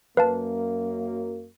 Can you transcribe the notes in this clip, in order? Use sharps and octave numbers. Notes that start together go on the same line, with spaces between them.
F#2 A#3 B4 F5 A5